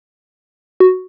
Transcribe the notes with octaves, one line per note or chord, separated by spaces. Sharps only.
F#4